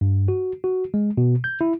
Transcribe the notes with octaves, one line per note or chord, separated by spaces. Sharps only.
G2
F#4
F#4
G#3
B2
G6
E4